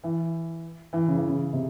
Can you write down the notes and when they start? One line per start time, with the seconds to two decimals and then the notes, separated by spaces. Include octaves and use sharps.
0.03 E3
0.93 E3
1.08 C#3
1.17 E3
1.27 C#3
1.53 C3